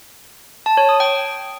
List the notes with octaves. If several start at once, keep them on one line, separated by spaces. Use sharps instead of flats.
A5
C#5
D#6
G5